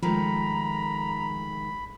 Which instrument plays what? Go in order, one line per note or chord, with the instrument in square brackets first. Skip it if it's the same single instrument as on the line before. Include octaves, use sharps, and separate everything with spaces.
[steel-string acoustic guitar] D#3 G#3 A3 [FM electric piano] F3 [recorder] A#5 [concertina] B5